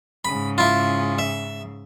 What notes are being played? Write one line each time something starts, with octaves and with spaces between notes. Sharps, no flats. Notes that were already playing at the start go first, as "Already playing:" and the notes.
G#2 C#3 B5
E4 F4
E5